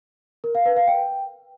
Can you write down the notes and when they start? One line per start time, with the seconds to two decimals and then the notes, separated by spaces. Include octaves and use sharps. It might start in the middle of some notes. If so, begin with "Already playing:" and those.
0.44 A#4
0.55 F5
0.66 B4
0.76 F5
0.87 G5